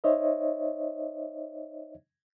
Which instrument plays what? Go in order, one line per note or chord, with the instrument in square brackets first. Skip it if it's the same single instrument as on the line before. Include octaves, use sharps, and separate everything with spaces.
[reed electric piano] D#4 C5 C#5 D#5 E5